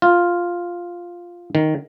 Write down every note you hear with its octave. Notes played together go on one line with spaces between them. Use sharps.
F4
D#3